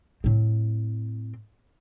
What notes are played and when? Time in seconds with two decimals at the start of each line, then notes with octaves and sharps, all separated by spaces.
0.24 A2 C4